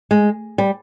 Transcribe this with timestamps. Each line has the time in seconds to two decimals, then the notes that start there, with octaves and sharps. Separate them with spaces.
0.11 G#3
0.58 G3